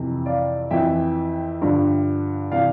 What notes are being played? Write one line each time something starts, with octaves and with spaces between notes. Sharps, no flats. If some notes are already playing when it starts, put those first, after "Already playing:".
Already playing: F2 C3 E3
D5 F5
F2 E3 E5 G5
G2 D3 F3
C3 E3 D5 F5